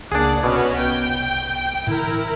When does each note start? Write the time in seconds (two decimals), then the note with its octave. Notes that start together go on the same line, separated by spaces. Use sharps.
0.12 C#2 A#3 D4 G#4 D5 F#5
0.44 C2 B2 B3 C#4 F#4
0.80 C2 G5
1.87 A2 D3 E3 E4 A#4